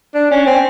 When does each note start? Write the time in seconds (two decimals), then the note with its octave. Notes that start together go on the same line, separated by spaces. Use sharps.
0.15 D4
0.31 C#4
0.47 C4